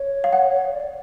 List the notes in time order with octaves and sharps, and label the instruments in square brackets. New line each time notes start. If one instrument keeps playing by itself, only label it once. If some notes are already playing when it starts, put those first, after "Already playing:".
Already playing: [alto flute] C#5
[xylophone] F5
F#5
[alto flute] D5